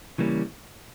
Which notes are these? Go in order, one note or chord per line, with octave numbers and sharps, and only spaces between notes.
C#3 E3 G3 A#3 C#4